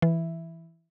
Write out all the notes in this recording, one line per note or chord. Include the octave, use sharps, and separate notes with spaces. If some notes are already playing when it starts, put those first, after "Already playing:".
E3